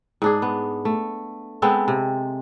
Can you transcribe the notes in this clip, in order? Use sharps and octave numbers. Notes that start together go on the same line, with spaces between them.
G#2 D4 G#4
B3
A3
G#3 B3 C4 A4
C3